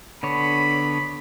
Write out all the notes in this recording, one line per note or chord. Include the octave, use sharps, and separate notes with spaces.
D3 B3 C#5 B5